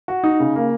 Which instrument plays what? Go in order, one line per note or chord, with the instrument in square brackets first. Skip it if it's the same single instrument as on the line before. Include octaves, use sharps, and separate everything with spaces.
[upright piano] F#4
D#4
C#3
A#3